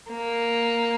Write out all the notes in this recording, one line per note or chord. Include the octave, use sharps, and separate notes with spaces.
A#3